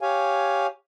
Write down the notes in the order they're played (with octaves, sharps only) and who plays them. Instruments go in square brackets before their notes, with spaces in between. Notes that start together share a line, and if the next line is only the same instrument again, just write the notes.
[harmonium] G4 C#5 F5 G#5